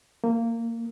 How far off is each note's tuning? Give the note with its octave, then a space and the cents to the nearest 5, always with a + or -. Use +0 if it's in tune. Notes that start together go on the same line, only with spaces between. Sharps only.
A#3 -20